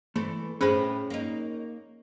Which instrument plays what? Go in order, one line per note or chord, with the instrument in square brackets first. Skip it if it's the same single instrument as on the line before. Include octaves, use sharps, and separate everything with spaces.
[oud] E3 A4 C5 [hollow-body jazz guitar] A3
[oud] A2 B4 [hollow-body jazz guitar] C#4 G5 [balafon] G#4 C5
[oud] A#3 D#4